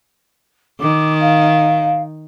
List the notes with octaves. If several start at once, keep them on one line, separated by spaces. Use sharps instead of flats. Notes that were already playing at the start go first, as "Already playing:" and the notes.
D#3 D6
F5